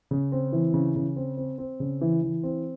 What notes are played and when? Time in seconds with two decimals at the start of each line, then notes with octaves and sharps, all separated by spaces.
0.11 C#3
0.32 C4
0.53 E3
0.74 C#3
0.96 C#3
1.16 C4
1.37 C4
1.58 C4
1.80 C#3
2.01 E3
2.22 E3
2.43 C4